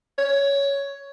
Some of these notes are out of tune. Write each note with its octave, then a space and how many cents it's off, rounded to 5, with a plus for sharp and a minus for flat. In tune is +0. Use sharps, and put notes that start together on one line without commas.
C#5 +10